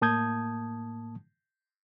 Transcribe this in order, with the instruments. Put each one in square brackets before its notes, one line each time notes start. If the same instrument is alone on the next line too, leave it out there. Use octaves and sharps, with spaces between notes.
[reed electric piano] A2 A#3 A5 D#6 G6 G#6